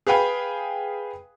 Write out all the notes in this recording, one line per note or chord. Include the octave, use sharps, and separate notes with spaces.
G#4 B4 F5 G5 G#5